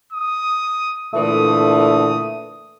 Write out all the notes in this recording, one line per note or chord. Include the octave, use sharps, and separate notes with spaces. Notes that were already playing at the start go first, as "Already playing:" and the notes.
D#6
A#2 D3 E3 A3 D#6